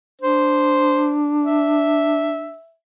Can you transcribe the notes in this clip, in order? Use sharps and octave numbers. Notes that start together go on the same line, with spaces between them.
D4 C5
E5